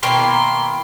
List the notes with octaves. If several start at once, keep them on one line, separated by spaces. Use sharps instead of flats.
B2 D#3 A#3 E4 G5 B5 C6